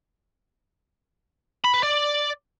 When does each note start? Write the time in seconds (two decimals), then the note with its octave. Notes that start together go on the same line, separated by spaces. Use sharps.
1.64 B5
1.74 B4
1.83 D5